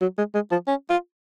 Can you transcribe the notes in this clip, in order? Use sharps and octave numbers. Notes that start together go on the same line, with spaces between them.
F#3
G#3
G#3
F3
C#4
F4